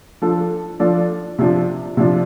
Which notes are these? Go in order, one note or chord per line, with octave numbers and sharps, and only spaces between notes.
F3 D4 A4 D5
F3 D4 A4 D5
C3 F3 D4
C3 F3 D4